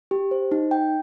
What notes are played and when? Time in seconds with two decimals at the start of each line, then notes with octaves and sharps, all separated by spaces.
0.11 G4
0.31 C5
0.52 D#4
0.71 G5